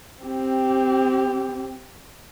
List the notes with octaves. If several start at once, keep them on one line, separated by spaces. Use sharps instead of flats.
C4 G4